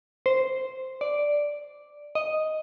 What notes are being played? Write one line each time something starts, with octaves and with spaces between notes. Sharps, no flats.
C5
D5
D#5